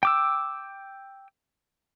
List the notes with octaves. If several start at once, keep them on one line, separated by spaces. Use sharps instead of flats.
G5 D6 E6